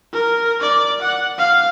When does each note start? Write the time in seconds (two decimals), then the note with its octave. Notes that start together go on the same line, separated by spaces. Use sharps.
0.13 A#4
0.61 D5
1.02 F#5
1.38 F5